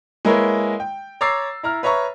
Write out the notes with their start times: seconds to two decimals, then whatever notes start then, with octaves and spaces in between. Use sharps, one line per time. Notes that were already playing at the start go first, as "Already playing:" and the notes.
0.25 G#3 A#3 E4 A#4 B4 C#5
0.80 G5
1.21 C#5 A#5 D6 E6 A6 C7
1.63 E4 A#5 F6
1.83 B4 C#5 E5 A#5 C#6